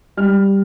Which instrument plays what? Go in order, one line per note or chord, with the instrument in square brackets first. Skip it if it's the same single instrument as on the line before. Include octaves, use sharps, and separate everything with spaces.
[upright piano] G3 F6